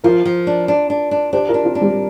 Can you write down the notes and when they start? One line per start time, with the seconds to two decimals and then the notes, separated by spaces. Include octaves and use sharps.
0.04 F3 F4 A#4
0.25 F3
0.47 D4
0.68 D4
0.90 D4
1.11 D4
1.33 D4 G4 C5
1.49 F4 A#4
1.54 D4
1.65 C4 F4
1.75 D4
1.80 G3 C4